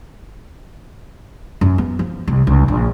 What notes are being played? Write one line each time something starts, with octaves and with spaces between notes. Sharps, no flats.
F#2
B3
F3
C2
C#2
A#1